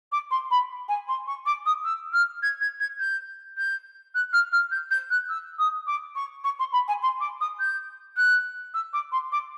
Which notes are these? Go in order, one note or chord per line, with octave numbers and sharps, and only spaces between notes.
D6
C6
B5
G#5
C6
C#6
D6
D#6
E6
F6
G#6
G#6
G#6
G6
G6
F#6
F6
F6
G6
G6
F#6
E6
D#6
D6
C#6
C#6
C6
B5
G#5
C6
D6
D#6
G6
F#6
E6
D6
C6
D6